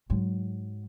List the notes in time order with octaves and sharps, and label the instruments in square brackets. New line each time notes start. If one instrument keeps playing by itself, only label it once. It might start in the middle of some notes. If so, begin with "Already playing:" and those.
[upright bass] G#2 F#3